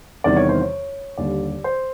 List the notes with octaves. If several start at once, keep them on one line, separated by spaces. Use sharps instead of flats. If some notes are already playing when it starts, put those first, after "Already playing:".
E2 C3 D#3 G3 D5
C#5
C5
C#5
D#2 D3 G3 D5
C5